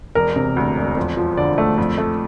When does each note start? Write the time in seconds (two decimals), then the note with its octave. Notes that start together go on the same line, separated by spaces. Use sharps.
0.15 E1 A#4
0.36 C3
0.56 D2
0.77 E1
0.96 F2
1.17 F3
1.37 D3 D5
1.58 A3
1.78 F2
1.98 A3